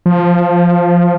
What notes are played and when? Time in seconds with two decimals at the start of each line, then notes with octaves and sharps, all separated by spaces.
0.06 F3